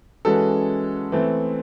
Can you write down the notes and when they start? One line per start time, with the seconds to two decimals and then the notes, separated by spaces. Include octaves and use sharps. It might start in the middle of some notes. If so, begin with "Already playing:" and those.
0.25 E3 G#3 C#4 F#4 A4
1.12 E3 A3 C4